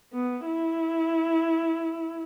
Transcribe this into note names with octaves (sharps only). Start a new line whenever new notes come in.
B3
E4